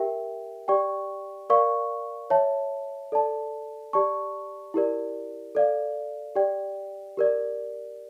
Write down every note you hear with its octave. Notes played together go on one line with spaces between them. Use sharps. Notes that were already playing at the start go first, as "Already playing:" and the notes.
Already playing: G4 A#4 E5 G5
G4 D5 G5 C#6
A#4 D5 F5 C#6
C#5 E5 A5
A4 D5 A5
G4 D5 A5 C#6
E4 G4 A#4 D5
A4 D5 F5
G4 D5 G5
G4 A#4 D5